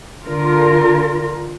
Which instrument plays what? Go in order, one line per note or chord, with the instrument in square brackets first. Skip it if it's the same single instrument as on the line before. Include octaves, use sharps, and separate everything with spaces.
[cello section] D3 F4 A#4